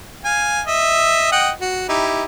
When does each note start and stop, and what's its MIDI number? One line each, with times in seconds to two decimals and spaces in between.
0.25 0.62 77
0.25 0.62 80
0.67 1.32 75
0.67 1.32 76
1.32 1.50 75
1.32 1.50 78
1.32 1.50 79
1.61 1.86 66
1.89 2.25 63
1.89 2.25 64
1.89 2.25 67